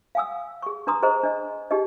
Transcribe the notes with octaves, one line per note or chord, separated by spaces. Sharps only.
F5 F#5 G#5 D#6 E6
G#4 C#6
D4 B4 A#5 C6 D#6
G#4 C5 D#5 A#5
D4 D#5
D4 D#4 G4 G#4 D#5